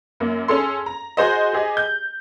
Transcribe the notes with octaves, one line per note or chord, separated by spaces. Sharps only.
F#2 A#3
C#4 G#4 A4 C6
A#5
F#4 G#4 C5 D#5
G4 G#4 D#5
G6